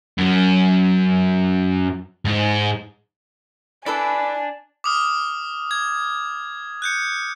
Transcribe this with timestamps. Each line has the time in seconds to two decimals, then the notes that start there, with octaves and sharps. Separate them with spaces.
0.18 F#2
2.25 G#2
3.86 E4 A4 B4 D5 G#5 A5
4.84 D6 D#6 F6
5.71 G#6
6.82 F#6 G6 C#7